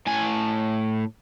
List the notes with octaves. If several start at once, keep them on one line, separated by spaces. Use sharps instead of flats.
A2 G#5